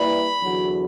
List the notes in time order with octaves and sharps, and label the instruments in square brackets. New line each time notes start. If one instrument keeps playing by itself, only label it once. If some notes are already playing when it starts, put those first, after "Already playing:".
Already playing: [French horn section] G3 A#3 E4 B4 D5 [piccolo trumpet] B5
[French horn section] E2 D3 F#3